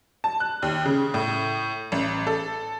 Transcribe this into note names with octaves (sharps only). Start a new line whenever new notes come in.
A5
F#6
D#2
C#3
A2
A1
A4